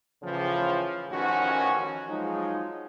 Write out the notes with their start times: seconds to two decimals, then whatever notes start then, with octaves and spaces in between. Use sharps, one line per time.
0.23 A2 C#3 E3 F3
1.11 A1 D#3 F3 C#4 F#4
2.08 F3 F#3 G#3 D#4